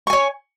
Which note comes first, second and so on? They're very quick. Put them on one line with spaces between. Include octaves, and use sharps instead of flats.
C#6 G#5 C#5